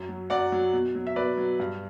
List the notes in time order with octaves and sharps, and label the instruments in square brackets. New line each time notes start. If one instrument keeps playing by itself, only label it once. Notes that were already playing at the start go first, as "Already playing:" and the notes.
Already playing: [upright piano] F#2
F#3
F#2 D5 F#5
F#3
B2
F#3
E5
B2 B4 D5
F#3
G2